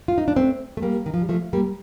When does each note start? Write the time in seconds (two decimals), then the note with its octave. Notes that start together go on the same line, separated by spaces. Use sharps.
0.08 F4
0.18 D#4
0.28 D4
0.36 A3 C4
0.77 A3
0.82 G3 A#3
1.06 D#3
1.14 F3
1.22 G3
1.29 F3 A3
1.53 G3 A#3